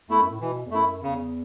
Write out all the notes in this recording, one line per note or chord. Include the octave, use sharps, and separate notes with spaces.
E2 A3 E4
F#2
A2
B2 E3
E2
F#2 A3 E4
E2 C#3